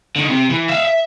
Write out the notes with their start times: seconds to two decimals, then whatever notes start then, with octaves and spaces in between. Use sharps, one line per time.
0.16 D3 D#3
0.29 C3
0.50 E3
0.69 E5 F5
0.85 E5